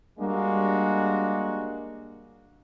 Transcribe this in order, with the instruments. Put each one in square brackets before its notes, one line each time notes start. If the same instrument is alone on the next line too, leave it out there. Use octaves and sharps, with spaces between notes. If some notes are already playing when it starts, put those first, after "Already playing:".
[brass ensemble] G3 G#3 A#3 D4 F#4